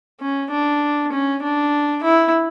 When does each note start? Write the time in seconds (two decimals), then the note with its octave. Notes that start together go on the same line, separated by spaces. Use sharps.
0.20 C#4
0.51 D4
1.12 C#4
1.43 D4
2.03 E4